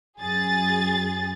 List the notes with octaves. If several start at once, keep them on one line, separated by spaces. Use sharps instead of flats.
F#2 G#4 A6